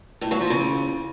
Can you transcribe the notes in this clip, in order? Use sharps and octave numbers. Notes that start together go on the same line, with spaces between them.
A2
F#3
F3
C#3